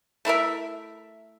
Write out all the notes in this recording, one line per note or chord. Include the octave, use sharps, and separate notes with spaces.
A3 E4 A#4 E5